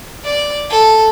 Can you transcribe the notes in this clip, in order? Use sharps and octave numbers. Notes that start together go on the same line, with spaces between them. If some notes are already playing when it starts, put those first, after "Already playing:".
D5
A4